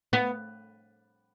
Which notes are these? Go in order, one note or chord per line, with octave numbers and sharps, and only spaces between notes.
B3